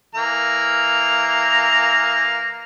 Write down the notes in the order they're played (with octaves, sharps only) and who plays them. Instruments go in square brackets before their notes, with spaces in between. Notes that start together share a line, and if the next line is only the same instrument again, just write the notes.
[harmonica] E3 A#3 A#5